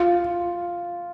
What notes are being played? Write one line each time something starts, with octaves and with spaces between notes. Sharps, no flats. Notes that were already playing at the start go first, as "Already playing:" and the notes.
Already playing: F4